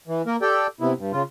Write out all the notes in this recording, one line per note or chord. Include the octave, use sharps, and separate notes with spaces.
E3
A#3 A#4
G4 A4 D5 G5
C3 B3 E4
G2
C#3 F4